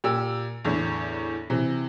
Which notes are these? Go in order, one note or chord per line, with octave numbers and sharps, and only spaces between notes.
A#2 G4 E6
E2 A2 D3
C3 E3